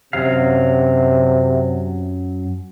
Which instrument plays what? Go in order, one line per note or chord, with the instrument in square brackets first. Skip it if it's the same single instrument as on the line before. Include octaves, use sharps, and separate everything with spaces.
[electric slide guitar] F#2 F#3 F5 [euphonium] C3